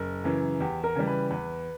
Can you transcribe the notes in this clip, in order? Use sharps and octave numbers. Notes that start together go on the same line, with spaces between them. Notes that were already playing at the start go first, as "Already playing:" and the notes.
Already playing: F#1 A#4
F#2 C#3 E3
E2 G4
A#4
C#3 E3 G3
B4
E2 B4